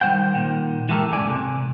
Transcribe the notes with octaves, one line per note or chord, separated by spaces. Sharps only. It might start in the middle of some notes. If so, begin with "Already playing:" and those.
D#3 G3 C5 F#5 G5
A#2 D#3
E3 G#3 A3 G4 A4 A#4
C#2 G#2 A3 D5 G#5
C3